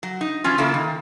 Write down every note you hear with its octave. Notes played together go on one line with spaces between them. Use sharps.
F#3
D#4
E3 F#3 C#4 F4
C#3 A#3 E4 A4
D#3